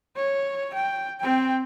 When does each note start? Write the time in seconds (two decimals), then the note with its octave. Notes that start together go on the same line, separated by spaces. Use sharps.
0.17 C#5
0.74 G5
1.20 C4 G5